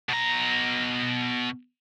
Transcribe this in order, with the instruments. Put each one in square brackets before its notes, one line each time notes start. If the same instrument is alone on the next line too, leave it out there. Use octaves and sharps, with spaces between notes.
[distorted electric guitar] B2 A#5